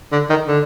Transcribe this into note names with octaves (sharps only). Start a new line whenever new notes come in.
D3
D#3
D3